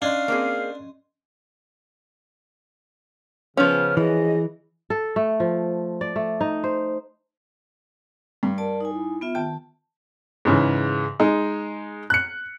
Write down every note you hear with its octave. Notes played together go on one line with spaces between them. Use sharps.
C#4 D4 D#5 F5 C6
A#3 C4 G#4
C#3 F3 B3 C#4 F6
E3 G#4 D#5
A4
A3
F3
D5
A3
D#4
C5
G2
A#4 D5 A5
D#4 G#5
E4
B3 F4 E5
D#3 G5 A5
G#2 C#3 E3
G#3 D#4
F#6 C#7